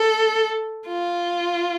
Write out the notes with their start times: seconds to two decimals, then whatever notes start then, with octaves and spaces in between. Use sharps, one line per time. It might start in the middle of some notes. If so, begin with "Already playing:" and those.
Already playing: A4
0.87 F4